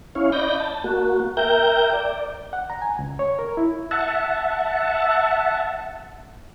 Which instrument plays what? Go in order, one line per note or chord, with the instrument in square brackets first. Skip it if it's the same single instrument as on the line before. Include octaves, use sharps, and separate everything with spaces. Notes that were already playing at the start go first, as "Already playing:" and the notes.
[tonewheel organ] C#4 E4 C#5 F5
D5 D#5 B5 G6 A#6
A5
A#3 F#4
A#4 E5 G5 A#5 G6
D5
[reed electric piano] F#5
A#5
G#5
C#2
C#5
A#4
E4
[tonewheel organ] E5 F#5 A5